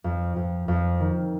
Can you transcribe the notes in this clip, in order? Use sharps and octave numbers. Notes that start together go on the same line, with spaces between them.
F2
F2
F2
D#3